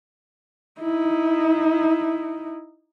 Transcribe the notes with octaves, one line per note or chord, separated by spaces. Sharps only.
D#4 E4